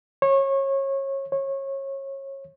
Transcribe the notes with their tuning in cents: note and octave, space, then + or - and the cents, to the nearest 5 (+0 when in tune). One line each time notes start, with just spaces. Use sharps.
C#5 -25
C#5 -25